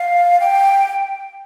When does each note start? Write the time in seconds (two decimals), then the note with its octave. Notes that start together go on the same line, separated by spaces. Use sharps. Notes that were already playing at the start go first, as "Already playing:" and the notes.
Already playing: F5
0.40 G5